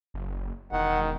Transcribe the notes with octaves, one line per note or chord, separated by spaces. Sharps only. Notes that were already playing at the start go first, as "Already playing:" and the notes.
F#1
E1 D#3 F#5